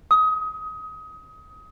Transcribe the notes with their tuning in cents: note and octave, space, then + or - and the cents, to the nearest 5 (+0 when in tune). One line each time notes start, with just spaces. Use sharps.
D#6 +25